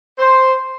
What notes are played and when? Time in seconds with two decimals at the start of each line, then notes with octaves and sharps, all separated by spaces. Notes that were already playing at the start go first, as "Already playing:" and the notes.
0.19 C5